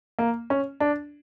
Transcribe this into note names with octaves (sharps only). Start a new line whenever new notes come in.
A#3
C#4
D4